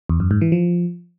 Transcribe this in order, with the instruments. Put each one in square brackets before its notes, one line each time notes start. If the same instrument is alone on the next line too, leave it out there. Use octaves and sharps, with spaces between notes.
[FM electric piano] E2
F#2
G#2
E3
F3